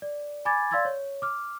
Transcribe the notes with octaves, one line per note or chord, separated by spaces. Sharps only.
D5
G#5 B5 D6 G#6 A6
D5 F5 C6 E6 G#6 A6
C#5
D6 F6